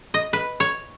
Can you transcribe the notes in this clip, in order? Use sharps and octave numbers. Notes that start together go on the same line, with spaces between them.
D#5
B4
C#5